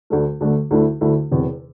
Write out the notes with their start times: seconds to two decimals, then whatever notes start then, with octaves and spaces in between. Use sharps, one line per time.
0.10 D2 D3 A3
0.41 D2 D3 A3
0.71 D2 D3 A3 E4
1.01 D2 D3 A3 E4
1.31 E1 E2 C3